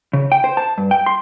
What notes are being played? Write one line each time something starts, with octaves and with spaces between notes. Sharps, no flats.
C#3
G5
C5
A5
G2
G5
C6